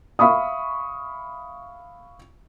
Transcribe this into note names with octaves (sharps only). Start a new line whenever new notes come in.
E5 F5 B5 C#6 D#6